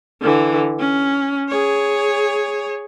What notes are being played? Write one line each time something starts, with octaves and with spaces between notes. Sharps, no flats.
D3 E3
C#4
G#4 C#5